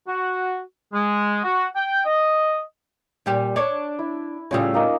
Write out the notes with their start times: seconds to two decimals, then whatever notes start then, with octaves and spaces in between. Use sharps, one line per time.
0.07 F#4
0.93 G#3
1.44 F#4
1.76 G5
2.05 D#5
3.26 A#2 G3 G4
3.56 D4 C#5
3.99 E4
4.51 A2 C#3 G3 C#4 F4 E6
4.74 A#3 D#4 F5